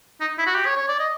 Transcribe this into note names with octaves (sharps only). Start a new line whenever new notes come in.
D#4
E4
F#4
G4
C#5
C#5
D5
D#5